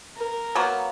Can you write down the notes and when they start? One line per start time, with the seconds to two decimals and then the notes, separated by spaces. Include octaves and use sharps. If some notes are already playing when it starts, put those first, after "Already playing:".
0.17 A#4
0.55 F#3 A#3 B3